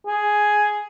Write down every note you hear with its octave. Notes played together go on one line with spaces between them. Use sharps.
G#4